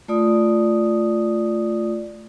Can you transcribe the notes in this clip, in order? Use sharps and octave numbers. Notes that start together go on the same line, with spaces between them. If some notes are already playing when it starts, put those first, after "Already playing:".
A3 F4 D5 D#6